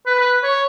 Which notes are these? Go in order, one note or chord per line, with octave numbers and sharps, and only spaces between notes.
B4
B4
C#5